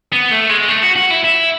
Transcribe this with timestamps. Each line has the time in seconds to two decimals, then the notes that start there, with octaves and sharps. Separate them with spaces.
0.12 B3
0.31 A3
0.49 G#3
0.68 A3
0.83 F#4
0.96 F#4
1.10 E4
1.24 E4